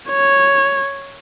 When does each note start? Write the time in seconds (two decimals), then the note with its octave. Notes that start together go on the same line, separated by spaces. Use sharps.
0.10 C#5